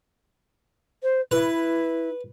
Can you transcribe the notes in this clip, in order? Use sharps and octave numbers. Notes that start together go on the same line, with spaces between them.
C5
E4 B4